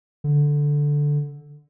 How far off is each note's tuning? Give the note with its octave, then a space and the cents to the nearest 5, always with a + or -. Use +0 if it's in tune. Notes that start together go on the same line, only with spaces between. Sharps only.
D3 -5